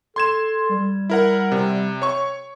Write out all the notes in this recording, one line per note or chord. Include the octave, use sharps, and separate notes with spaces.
A4 C6 G#6 E7
G3
E4 A#4 F#5
C3
C#5 C#6